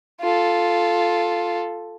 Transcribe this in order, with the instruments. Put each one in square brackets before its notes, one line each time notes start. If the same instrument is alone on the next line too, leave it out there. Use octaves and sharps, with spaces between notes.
[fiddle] F4 A4